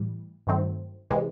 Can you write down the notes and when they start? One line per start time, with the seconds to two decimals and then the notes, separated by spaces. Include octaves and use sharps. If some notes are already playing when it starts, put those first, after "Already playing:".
Already playing: A2 E3 G3
0.47 G2 D#3 F#3 A3 C4
1.10 C3 E3 G#3